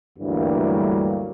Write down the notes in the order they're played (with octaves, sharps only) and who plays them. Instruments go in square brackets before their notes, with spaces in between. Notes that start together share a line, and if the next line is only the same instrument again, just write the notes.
[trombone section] D2 G2 E3 F#3 G3 A#3